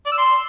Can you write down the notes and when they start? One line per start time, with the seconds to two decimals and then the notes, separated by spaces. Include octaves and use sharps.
0.06 D5
0.12 E6
0.18 C6